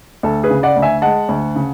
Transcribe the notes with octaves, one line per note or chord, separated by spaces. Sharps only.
D2 A4
G#4 B4
C#3
D5 F#5
D2
E5 G#5
G#3 F#5 A5
D2
C#3